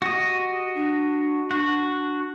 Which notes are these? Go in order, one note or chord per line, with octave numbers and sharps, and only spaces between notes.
F#4 G4 D#5
D4
D4 F#4